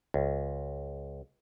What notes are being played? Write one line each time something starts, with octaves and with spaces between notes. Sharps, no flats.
C#2